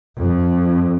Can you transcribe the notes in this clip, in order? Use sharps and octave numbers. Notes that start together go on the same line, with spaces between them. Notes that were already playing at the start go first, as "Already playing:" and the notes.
F2